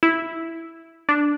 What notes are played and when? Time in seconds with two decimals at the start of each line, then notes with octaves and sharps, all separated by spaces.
0.03 E4
1.09 D4